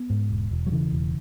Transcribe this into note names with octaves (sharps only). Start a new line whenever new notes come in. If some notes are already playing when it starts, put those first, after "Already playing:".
Already playing: B3
G#2
E1
E1
F#3
C#3 E3
E1